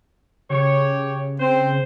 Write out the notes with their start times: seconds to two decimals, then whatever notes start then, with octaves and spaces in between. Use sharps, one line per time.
0.50 C#3 G4 C#5
1.40 C4 C5